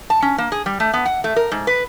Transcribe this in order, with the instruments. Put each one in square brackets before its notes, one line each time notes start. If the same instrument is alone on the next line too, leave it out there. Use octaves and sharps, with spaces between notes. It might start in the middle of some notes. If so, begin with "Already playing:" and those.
[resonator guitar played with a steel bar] A5
C#4
A#3
G#4
G3
A3
B3
F#5
A3
A#4
G#2
B4